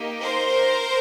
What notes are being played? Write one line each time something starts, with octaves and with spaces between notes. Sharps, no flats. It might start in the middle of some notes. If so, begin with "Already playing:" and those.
Already playing: A#3 D#4 G4
A#4 C5